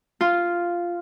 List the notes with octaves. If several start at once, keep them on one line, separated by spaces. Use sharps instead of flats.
F4